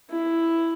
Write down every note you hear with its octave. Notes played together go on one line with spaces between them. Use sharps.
E4